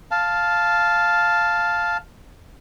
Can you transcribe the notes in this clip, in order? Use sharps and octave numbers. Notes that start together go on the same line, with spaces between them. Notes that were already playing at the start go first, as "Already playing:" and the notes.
F5 A5